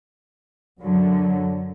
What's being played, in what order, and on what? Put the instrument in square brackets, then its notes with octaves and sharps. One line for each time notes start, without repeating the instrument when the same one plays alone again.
[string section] F#2 D3 F#3